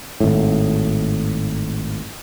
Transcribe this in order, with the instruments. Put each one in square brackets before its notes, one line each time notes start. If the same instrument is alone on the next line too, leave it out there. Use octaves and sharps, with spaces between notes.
[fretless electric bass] G#1 A2